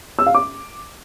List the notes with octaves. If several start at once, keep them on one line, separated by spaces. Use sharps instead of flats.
E6
F5
D6